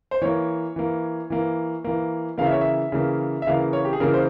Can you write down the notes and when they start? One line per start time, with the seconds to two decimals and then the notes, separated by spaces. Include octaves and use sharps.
0.11 C5
0.22 E3 A#3 C#5
0.76 E3 A#3
1.30 E3 A#3
1.84 E3 A#3
2.38 C#3 E3 A#3 F5
2.46 E5
2.52 C#5
2.61 E5
2.92 C#3 E3 A#3
3.42 E5
3.47 C#3 E3 A#3 F5
3.73 C#5
3.85 G4
3.93 G#4
4.00 C#3 E3 A#3 A#4
4.14 C5